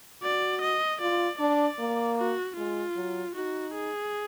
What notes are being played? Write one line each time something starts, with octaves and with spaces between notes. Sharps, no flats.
F#4 D5
D#5
F4 D5
D4 D5
A#3
F#4
G#3 F4
F#3
D#4 F#4
G#4